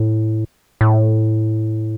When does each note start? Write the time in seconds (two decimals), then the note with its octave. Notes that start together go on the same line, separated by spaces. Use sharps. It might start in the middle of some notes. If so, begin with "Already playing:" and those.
Already playing: A2
0.81 A2